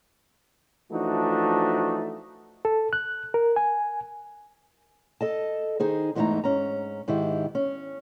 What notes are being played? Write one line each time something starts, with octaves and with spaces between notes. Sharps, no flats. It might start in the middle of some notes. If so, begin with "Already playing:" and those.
E3 F3 A3 D4 D#4 F#4
A4
F#6
A#4
G#5
A4 D#5 A5
D#3 D#4 G#4 C5
E2 G#2 E3 A3 D#4 A#5
G#2 C#4 A#5
G#2 D#3 E4 G4
C#4